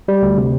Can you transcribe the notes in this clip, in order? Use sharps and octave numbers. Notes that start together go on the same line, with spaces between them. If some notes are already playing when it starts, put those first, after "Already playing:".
G3
D2
C3